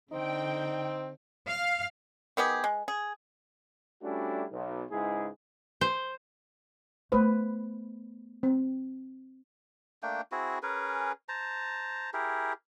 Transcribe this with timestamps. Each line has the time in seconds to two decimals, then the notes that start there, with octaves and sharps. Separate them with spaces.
0.11 D3 C4 D#4 G5
1.47 F5
2.37 D#3 B3 G4 G#4
2.64 G#3
2.88 G#4
4.03 G3 A3 C#4 D4 E4 F#4
4.51 B1
4.91 C#2 G#2 G#3 E4 G#4
5.81 C5
7.12 A3 B3 B4 C5
8.43 C4
10.03 A3 A#3 D4 G5
10.32 C4 E4 F#4 G#4
10.63 C#4 G#4 A#4 B4
11.29 C5 A5 A#5
12.13 E4 G4 G#4 A#4